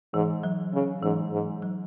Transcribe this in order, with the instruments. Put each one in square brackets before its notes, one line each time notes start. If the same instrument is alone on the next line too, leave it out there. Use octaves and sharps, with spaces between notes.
[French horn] G#2 [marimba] E3
[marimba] F#3
[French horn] C#3
[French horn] G#2 [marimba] E3
[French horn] G#2
[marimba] F#3